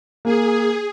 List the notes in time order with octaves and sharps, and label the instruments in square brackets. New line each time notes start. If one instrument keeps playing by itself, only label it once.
[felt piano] A#3 [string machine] G#4